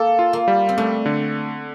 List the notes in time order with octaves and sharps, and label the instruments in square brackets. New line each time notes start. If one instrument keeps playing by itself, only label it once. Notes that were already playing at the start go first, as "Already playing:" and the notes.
Already playing: [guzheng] A#3 [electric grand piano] A4
[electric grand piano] F4
[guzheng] A#3
[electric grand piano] G3
[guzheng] C4
[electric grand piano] A3 [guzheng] D4
[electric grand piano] D3